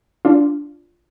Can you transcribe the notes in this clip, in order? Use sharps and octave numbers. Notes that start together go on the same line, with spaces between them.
D4 F4